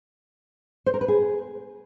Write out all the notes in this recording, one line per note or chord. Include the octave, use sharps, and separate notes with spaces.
C5
A#4
B4
G#4